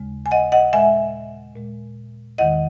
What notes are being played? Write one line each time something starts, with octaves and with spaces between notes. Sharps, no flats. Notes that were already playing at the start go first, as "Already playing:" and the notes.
Already playing: D#2 C#3 G#3
G#5
D#5 F#5
D#5 F#5
A#2 G#3 E5 G#5
A#2 G#3
E2 D#3 G#3 D#5 F#5